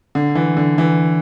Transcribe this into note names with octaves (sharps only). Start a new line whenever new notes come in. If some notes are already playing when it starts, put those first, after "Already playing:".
D3
E3
D3
E3